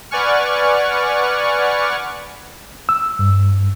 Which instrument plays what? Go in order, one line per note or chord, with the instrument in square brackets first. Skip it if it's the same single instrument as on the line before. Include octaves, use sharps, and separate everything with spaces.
[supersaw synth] B4 D5 F#5 G#5 C#6 F6
[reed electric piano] E6
G2